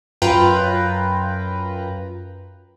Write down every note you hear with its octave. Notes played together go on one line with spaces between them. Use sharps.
F#2 F4 B4 G5 A#5